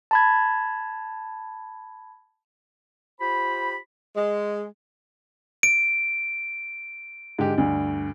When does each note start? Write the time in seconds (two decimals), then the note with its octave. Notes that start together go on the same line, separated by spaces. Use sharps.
0.11 A5 B5 G#6
3.21 F4 G4 C5 B5
4.16 G#3
5.63 D7
7.39 G#2 D3 G4
7.58 D2 G2